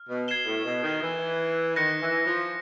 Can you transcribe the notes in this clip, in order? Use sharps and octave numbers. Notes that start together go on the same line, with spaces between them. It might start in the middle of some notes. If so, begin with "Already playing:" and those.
Already playing: F6
B2
G#6 C7 E7 G7
A2
B2
D#3
E3
D#3 F#6 A#6 C#7
E3
F3